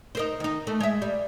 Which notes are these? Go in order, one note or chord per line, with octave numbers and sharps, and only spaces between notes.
D#4 A#4 C5
D#3 D#4
A3
G#3 E5
G3